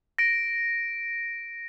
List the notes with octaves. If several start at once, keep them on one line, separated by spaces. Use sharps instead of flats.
A#6 D7